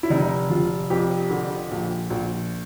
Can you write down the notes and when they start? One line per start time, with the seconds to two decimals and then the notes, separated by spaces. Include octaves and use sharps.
0.03 E4
0.10 F1 D#4
0.50 F1 F4
0.90 F2 G4
1.31 D3
1.71 A#1
2.10 A#1